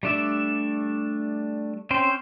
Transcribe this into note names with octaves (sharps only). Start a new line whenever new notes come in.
G3 A3 D4 D5 E5
C4 C#4 C5 G5